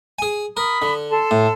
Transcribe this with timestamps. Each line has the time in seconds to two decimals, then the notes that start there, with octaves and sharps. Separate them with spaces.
0.19 G#4 G#5
0.57 A#4 B5 D#6
0.82 D3
1.10 A4 A5 C6
1.31 A2